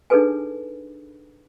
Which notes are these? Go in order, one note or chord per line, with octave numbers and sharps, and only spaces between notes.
D4 D#4 G#4 A4 B4 G#5